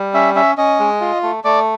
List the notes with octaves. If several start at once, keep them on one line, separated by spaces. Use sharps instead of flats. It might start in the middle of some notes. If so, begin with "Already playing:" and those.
Already playing: G3
C#4 E5
C#4 E5
C#4 D#5
G#3
F4
A3
A3 D5